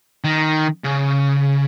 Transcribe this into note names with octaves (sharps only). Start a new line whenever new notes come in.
D#3
C#3